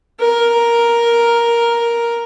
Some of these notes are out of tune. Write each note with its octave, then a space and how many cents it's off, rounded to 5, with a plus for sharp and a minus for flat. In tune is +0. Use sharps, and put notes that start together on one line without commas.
A#4 +5